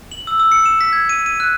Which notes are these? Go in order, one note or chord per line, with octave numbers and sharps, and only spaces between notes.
F#7
E6
E6
C#7
E7
B6
G#6
D#7
D#7
F#6